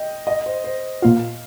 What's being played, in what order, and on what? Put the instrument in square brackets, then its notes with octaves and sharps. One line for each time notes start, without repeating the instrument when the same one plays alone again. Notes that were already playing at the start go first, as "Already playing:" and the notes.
Already playing: [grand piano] D#5 G5
D#5
C5
C5
[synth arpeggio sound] A#2 A#3 F4 [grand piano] F5